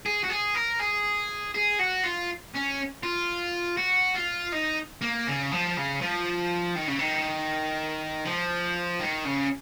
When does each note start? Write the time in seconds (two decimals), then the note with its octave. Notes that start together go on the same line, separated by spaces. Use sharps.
0.06 G#4
0.24 F#4
0.30 G#4
0.55 A#4
0.80 G#4
1.55 G#4
1.79 F#4
2.03 F4
2.54 C#4
3.03 F4
3.77 F#4
4.15 F4
4.52 D#4
5.01 A#3
5.27 C#3
5.52 F3
5.77 C#3
6.01 F3
6.75 D#3
6.87 C#3
6.99 D#3
8.25 F3
8.99 D#3
9.25 C#3